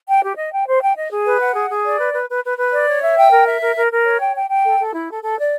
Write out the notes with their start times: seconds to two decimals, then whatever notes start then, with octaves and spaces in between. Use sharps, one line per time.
0.09 G5
0.24 G4
0.38 D#5
0.52 G5
0.67 C5
0.82 G5
0.97 D#5
1.11 G#4
1.26 B4
1.41 F#5
1.56 G#4
1.70 G#4
1.85 D5
2.00 B4
2.14 B4
2.29 B4
2.44 B4
2.59 B4
2.73 D5
2.88 C#5
3.02 E5
3.17 G5
3.32 A#4
3.47 E5
3.61 A#4
3.76 A#4
3.91 A#4
4.05 C#5
4.20 G5
4.35 G5
4.50 G5
4.64 A4
4.79 A4
4.94 E4
5.08 A4
5.23 A4
5.38 D5